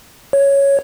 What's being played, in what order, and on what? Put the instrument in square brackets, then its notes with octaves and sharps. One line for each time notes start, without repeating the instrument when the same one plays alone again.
[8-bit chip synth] C#5